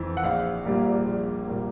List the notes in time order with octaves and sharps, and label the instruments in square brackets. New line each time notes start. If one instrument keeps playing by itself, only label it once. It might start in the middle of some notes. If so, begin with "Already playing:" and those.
Already playing: [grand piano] F2 E3
F#5
A#1 F5
A#2 G3 A#3
A#1
A#2 G3 A#3